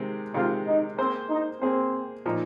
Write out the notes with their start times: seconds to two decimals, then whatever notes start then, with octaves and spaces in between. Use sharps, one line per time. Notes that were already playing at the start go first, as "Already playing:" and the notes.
Already playing: C3 D#3 G#3 C4
0.34 C3 D#3 G#3 C4 F4
0.67 D#4
0.98 A#3 C4 G#4 C5
1.30 D#4
1.61 A#3 C4 G#4 C5
2.26 A#2 F3 A#3 D#4